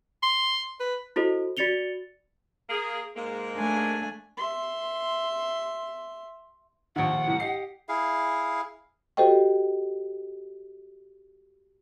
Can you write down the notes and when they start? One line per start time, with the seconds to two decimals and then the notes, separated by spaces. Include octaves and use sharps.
0.22 C6
0.80 B4
1.16 E4 F#4 A4 C5 D#5
1.57 F#4 D5 A6 C#7 F7 G7
2.69 A#3 G#4
3.16 G#2 G#3 A#3
3.54 A3 D4 G#5
4.37 E5 C6
6.96 A#1 D#2 F#5
7.27 C2 A2
7.40 G4 D#5 C7
7.89 E4 G#4 F5
9.17 F#4 G4 A4 C5 D#5 G5